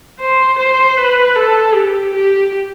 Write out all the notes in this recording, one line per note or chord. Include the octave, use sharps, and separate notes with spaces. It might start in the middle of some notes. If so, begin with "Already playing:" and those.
C5
C5
B4
A4
G4
G4